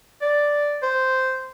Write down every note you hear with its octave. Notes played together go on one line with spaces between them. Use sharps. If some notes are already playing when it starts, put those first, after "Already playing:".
D5
C5